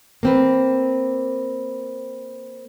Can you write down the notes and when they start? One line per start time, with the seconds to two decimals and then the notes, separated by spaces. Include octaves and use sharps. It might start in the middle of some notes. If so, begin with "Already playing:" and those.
0.23 A#3 C4 B4